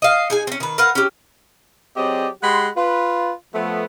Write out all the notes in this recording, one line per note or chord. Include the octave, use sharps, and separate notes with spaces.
D#5 F5
D#4 G#4 G#5
C4 C#4
D#3 B4
A#4 B4 F5 F#5
C#4 G4
F#3 C4 G4 G#4 D5 D#5
G#3 G4 F#5 B5 C6
F4 B4
F3 A3 B3